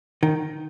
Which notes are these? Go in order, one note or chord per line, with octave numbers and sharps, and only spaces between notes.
D#3